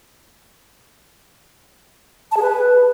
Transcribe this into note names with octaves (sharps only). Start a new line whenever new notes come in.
A5
G#4
B4